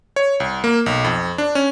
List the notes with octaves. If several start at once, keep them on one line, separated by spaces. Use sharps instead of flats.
C#5
C2
A#3
B1
F2
D4
C#4